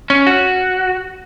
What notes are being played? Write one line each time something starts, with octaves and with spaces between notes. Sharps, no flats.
C#4
F#4